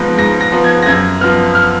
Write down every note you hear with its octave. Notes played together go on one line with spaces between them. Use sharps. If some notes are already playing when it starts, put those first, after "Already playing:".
Already playing: G#2 F3 B3 A#6
G#2 A#6
A#6
F3 B3
G#6
A#6
F#2 G#6
F3 B3 F6
F6